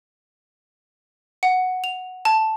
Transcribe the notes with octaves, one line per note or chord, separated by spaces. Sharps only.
F#5
F7
A5